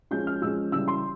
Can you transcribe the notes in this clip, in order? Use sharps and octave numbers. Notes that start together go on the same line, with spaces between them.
F3 G#3 C#4 G6
F6
F3 G#3 C#4 E6
C#3 E3 G3 E6
C6